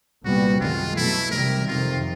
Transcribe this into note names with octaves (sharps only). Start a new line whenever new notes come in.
C2 A#2 G3 B3 F#4
F#2 D#3 G#3 F4
B2 F#3 A3 E4
C3 D#3 G3 A#4
F2 C3 D#3 F4